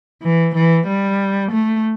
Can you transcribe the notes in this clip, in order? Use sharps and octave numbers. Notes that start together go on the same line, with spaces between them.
E3
E3
G3
A3